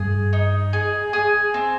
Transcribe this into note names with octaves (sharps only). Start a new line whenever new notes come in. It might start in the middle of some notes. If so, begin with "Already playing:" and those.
Already playing: G2 G#4
D#4
G#2 G#4
G#4
C4